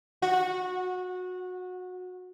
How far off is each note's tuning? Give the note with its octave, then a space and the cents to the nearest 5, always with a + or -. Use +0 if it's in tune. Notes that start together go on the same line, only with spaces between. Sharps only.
F#4 -20